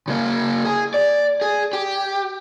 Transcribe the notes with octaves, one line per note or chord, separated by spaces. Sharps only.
C#3 A#3
G#4
D5
G#4
G4